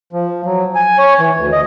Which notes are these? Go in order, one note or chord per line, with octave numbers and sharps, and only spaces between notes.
F3
F#3
G#5
C#5
E3
D2
D#5